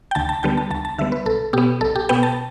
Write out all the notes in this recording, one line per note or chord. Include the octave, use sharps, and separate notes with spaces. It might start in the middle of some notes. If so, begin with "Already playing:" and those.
G5
D2 A5
A5
D3 G3 B3 G5
A5
D2 A5
A5
D3 G3 B3 E5
B4
B1 A4
B2 B3 G4
B1 A4
G4
B2 B3 G5
A5